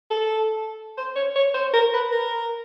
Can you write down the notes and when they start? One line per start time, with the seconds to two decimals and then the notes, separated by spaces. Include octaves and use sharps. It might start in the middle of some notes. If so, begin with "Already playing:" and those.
0.11 A4
0.97 C5
1.16 C#5
1.36 C#5
1.54 C5
1.73 A#4
1.94 B4
2.12 A#4